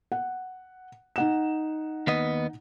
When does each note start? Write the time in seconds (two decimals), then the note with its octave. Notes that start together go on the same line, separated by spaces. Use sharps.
0.12 F#5
1.16 D#4 F#5 E7
2.07 D#2 B3 D#5